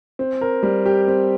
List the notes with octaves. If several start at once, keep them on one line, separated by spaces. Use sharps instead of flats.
C4
A#4
G3
G4
C4